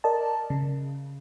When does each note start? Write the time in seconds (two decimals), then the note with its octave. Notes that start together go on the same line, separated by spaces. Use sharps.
0.04 A#4 D5 D#5 A5
0.50 C#3